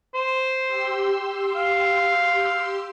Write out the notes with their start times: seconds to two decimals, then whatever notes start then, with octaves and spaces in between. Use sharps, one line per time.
0.14 C5
0.68 G4 C6 E6
1.55 F5